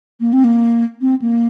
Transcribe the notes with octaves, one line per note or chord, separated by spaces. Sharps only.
A#3
C4
A#3
C4
A#3